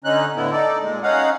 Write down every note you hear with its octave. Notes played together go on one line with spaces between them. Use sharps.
D3 C#4 D#4 F#6
A2 D3 B3 E4
D#4 A4 D5
A#2 G#3
C#4 D#4 F5 F#5